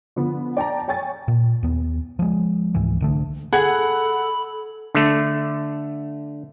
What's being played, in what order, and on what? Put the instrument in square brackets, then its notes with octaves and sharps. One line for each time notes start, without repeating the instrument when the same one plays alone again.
[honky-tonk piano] D3 F3 B3
D5 G5 A5 A#5
C#5 G5 G#5 C#6 A6
[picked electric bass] A#2
D#2 B3
F3 G#3
C#2 G#2 E3
C2 D3 A3
[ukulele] G#4 [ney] A4 [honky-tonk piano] F#5 [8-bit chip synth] B5
[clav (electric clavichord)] D3 A3